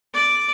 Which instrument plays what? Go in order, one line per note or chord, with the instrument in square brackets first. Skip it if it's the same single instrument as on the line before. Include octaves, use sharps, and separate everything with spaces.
[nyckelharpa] D5